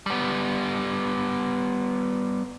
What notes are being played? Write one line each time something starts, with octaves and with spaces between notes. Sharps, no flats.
G3 B3